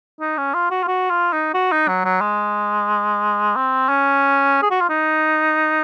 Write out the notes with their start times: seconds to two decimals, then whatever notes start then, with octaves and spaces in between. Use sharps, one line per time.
0.20 D#4
0.38 C#4
0.54 F4
0.71 F#4
0.83 F4
0.88 F#4
1.10 F4
1.33 D#4
1.54 F#4
1.72 D#4
1.88 F#3
2.05 F#3
2.21 G#3
3.56 C4
3.89 C#4
4.62 G#4
4.71 F#4
4.81 F4
4.90 D#4